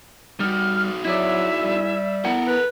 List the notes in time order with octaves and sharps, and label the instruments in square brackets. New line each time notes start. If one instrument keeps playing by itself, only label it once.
[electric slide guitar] G3 [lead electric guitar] D#4 F#4 [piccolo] F6
[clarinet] F#3 [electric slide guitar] E4 G#4 D5 [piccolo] E5
[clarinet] G3
[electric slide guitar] B3 E4 F#5 [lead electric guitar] A4 A#4
[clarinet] B4